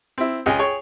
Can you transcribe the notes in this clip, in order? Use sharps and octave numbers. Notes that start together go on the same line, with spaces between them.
C4 E4
C#2 C#4 G#4 D#5 G5
G#4 C#5 G5 C#6